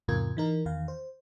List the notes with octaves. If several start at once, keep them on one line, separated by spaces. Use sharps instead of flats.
E2 G#2 C3 F4 A#4 G#6
E3 D#4 A#4
E2 D#3 F5
C5